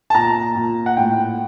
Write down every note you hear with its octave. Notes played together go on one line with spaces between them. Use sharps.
A5
A#2 A#5
A#2
F#5
A2 G5